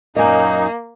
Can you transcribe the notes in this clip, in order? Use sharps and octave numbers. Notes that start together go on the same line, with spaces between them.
F#2 A#2 A#3 D#4 D#5 G#5